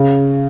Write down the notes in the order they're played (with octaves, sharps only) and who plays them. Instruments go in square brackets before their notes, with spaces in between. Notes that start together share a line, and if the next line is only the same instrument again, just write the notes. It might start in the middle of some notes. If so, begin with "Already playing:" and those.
Already playing: [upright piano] C#3